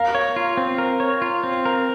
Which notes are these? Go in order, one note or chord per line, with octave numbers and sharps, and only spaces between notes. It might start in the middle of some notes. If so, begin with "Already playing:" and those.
Already playing: A#4 F5
C#5
F4
C4
A#4
C#5
F4
C4
A#4